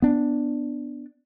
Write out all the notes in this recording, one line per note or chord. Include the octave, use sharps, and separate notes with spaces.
B3 D4